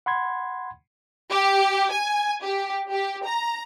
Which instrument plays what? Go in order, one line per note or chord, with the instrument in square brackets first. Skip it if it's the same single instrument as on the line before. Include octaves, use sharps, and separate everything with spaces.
[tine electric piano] F#5 B5 C6 G#6
[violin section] G4
G#5
G4
G4
A#5